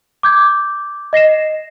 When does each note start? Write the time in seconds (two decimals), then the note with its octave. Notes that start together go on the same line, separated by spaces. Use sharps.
0.23 D6 G6 G#6
1.13 D#5 A#6 C7 E7